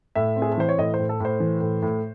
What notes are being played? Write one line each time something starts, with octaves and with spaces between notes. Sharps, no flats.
A2 E5
C4
G#4
A4
E3 C5
C#5
A2 D#5
C5
A2
A4
A2 C5
E3
A2
A2